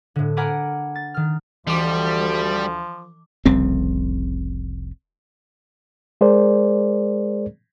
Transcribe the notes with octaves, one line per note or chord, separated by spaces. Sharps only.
A2 D3
A#4 F#5 G#5 A#5 B5 D6
A6
D#3 F6
D2 E3 F3 G3 D6
F1 C2 C#3 C4
G#3 G#4 A#4 C5 D5